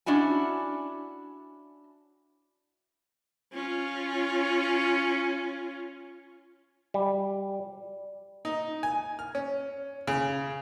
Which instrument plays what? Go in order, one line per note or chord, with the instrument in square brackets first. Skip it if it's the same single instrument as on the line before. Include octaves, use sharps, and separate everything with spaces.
[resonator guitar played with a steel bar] C#4 D4 E4 F#4 G#5
[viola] C#4 F4
[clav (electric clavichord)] G3
[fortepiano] D#4
G#5
F6
C#4
C#3